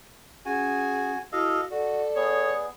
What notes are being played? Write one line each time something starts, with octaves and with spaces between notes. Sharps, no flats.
C#4 F#4 G#4 G#5
E4 F#4 A4 D#5 F5
F#4 A4 D5
B3 G#4 C#5